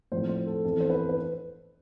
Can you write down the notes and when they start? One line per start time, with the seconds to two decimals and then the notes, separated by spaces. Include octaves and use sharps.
0.12 A2 F3 C4 C5
0.29 C5
0.47 A4
0.64 F2 E3 B3 A4
0.80 C5
0.90 B4
1.09 B4